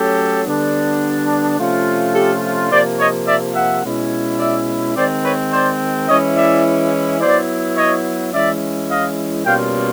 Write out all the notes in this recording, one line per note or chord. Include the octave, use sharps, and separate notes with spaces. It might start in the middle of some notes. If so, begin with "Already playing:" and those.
Already playing: F#3 A3 C#4 G4 A4
D3 G3 B3 D4
C3 F3 A3 C#4 F4
G4 A4
C3 F3 A#3 C5 D5
C#5 D#5
D5 E5
E5 F#5
B2 G#3 C#4 E4
D5 E5
D#3 G#3 C4 C5 D5
B4 C#5
C5 D5
E3 G#3 C#4 E4 C#5 D#5
D5 E5
F#3 B3 E4 C5 D5
C#5 D#5
E3 G#3 C#4 E4 D5 E5
D#5 F5
B2 G3 A#3 C#4 F4 F5 G5